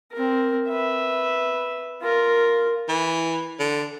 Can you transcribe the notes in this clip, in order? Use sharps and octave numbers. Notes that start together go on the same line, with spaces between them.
C4 A#4
B4 E5
F4 A#4
E3
D3